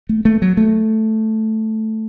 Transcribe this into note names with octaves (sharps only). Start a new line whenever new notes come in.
A3
A3
F#3
A3